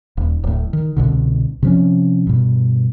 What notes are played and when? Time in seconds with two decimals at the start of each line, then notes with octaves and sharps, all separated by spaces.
0.17 D#1
0.44 D1 A2
0.73 D#3
0.97 C2 B2 D3
1.63 C3 F3 C#4
2.27 G2 B2